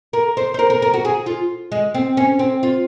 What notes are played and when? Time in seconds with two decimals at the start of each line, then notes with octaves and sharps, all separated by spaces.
0.13 A#4
0.37 C5
0.54 C5
0.59 A#4
0.70 A#4
0.82 A#4
0.94 F#4
1.05 G#4
1.26 F4
1.72 G#3
1.94 C4
2.17 C#4
2.39 C4
2.63 F4